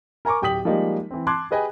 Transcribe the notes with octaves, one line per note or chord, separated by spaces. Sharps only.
A#4 G#5 A#5 C#6 D6
D1 G4 G5 D#6 B6 F#7
F3 G3 G#3 A#3 D#4 G4
E3 C4
A5 C6 D6 F#6 G#6
G4 G#4 B4 D#5 G5 G#5